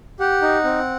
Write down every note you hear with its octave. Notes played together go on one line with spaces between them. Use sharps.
G4 F#5
D#4
C4